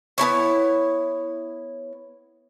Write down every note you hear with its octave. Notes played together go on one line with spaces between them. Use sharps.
B3 D#4 E4 C#5